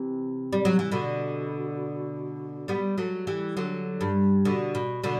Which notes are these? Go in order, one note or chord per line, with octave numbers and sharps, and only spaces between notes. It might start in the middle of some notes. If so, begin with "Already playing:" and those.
Already playing: C3 E3
G3
F#3
E3
B2 D3
G3 B3
F#3 A3
E3 G3
D3 F#3
G2
B2 D3
B2
B2 D3